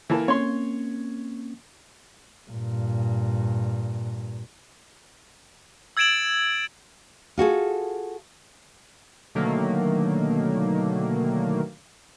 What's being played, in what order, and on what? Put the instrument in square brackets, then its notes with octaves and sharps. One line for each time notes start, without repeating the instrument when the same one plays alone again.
[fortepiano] E3 A#3 A5
[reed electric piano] A#3 C4 C#4 [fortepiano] C#5 C6
[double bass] G2 A#2
[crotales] E6 G#6 A6 D7 E7 F#7
[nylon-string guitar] F4 F#4 G#4 A4
[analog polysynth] B2 D3 D#3 F#3 A3 A#3